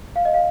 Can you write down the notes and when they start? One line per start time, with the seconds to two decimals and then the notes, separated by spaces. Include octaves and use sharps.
0.16 F5
0.25 D#5
0.34 F5